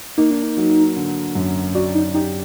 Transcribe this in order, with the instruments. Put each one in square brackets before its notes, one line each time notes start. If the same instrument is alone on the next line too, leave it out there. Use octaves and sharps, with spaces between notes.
[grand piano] A#3 [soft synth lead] D#4
[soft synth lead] D4
D#4
[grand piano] F#3
D3
F#2
[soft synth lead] F#4 [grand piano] D5
[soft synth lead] D#4
[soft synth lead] D#4 [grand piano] G4